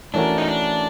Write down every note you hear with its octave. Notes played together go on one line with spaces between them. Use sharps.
E3 A3 C#4 D4 F#4 A#4
D#4
D4